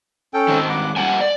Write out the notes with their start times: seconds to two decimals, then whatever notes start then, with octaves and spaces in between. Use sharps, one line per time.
0.34 C#4 A4 G5
0.48 G#2 D#3
0.69 G2 F#5 D6
0.96 G3 A#3 F#5 G#5
1.21 D5